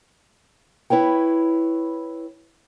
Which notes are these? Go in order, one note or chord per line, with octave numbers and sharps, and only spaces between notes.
E4 B4 C#5 G5